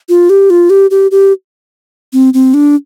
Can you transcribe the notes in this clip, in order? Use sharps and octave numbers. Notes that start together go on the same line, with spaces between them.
F4
G4
F4
G4
G4
G4
C4
C4
D4